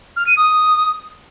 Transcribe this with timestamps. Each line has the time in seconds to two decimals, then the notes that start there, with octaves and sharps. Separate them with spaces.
0.16 F6
0.26 D#7
0.36 D#6